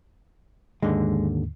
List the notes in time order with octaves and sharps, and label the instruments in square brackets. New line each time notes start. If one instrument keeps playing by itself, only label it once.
[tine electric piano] D#2 G#2 D3 [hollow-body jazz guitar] G#3